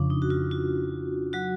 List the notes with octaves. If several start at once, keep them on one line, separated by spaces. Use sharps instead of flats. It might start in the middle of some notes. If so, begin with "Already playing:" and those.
Already playing: F2 C#3 F3 C#4 D4
D#4
F#4
F4
F4
F#3 F#4